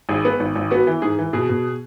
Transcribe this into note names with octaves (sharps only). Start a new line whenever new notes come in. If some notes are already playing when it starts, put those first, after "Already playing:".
G#1 G#4
B3
G#1
G#1
B3 F#4
E3
G#2 G#4
E3
B2 G#4
B2